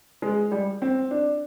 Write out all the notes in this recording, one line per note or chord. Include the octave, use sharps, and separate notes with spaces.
G#3
G3
C4
D4